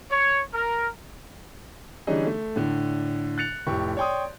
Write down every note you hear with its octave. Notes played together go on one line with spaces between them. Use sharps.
C#5
A#4
D3 E3 G3 C#4 D#4 G#4
A3
A2 D3
F#6 A6 C#7 F7
F1 A2 G4 C#6
C#5 D5 G5 C6 D#6